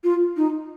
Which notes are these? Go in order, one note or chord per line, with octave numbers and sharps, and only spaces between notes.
F4
D#4